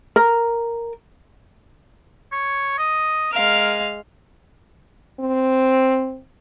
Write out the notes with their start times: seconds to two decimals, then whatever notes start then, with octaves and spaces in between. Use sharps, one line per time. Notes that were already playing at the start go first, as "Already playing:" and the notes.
0.16 A#4
2.32 C#5
2.78 D#5
3.33 G#3 A#4 F5
5.20 C4